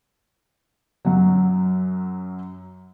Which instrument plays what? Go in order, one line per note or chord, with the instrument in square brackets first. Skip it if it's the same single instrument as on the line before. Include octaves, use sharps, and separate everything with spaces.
[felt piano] F#2 F#3